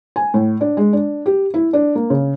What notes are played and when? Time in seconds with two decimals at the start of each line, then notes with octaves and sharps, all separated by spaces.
0.16 G#5
0.34 A2
0.61 D4
0.77 G#3
0.93 D4
1.26 G4
1.54 E4
1.73 D4
1.95 A#3
2.10 C#3